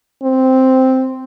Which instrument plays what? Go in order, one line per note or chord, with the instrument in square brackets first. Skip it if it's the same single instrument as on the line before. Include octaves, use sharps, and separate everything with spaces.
[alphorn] C4